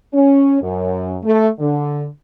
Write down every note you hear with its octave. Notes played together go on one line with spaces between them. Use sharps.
C#4
F#2
A3
D3